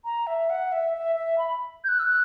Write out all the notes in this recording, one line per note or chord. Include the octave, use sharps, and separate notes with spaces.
A#5
E5
F#5
E5
E5
E5
B5
G6
F#6
E6
F#6